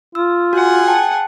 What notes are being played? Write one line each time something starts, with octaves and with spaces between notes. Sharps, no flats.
F4 E6
F#4 G#4 F#5
G5 A5